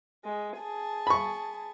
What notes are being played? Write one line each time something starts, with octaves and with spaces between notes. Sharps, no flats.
G#3
G#4 A5
B5 C#6